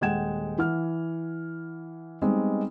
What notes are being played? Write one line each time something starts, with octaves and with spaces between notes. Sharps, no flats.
D#1 G#3 F#5 G5 G#6 E7
E3 F#5 F6
G3 G#3 B3 C4 D#4